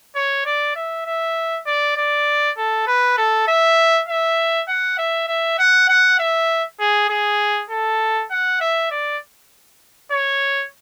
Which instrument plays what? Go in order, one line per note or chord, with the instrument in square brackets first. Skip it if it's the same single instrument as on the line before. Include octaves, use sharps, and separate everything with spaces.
[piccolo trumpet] C#5
D5
E5
E5
D5
D5
A4
B4
A4
E5
E5
F#5
E5
E5
F#5
F#5
E5
G#4
G#4
A4
F#5
E5
D5
C#5